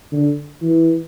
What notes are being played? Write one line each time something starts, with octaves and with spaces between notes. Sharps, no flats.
D3
E3